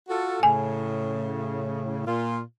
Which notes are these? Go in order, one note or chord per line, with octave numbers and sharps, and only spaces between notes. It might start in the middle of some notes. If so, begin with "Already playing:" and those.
F4 F#4 A4
A2 C#3 G#5
A#2 F4